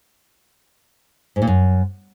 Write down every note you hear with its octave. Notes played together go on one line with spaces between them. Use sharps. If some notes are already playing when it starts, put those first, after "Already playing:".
G#2
A#2
F#2